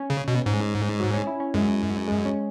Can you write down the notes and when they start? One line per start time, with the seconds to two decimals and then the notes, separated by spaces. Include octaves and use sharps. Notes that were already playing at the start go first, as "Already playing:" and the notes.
Already playing: C#4
0.10 C#3
0.28 B2
0.46 G#2
1.00 F#3
1.14 C#4
1.27 E4
1.40 C#4
1.54 F#2 G#3
2.08 G#3
2.25 C#4